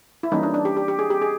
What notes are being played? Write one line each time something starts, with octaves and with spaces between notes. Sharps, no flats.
E4
E3 G3 A#3 C#4 D#4
D4
D4
G4
G4
G4
G#4
G4
G#4